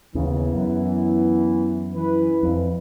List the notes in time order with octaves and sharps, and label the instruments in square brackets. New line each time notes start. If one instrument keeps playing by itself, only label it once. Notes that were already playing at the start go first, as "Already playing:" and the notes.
[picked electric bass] D#2 C#3 [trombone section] E3 B3
[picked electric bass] F#2
[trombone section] E3 B4
[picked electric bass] F2